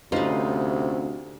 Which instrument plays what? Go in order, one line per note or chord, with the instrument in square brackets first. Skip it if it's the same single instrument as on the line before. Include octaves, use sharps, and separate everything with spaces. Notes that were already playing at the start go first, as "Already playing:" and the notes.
[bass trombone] D2 [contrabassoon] C3 [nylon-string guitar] C#4 F4 C5 [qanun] D#4 B4